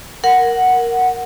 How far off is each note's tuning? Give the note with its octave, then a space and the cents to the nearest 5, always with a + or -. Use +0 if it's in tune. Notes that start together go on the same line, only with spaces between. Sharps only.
A#4 +0 F#5 +0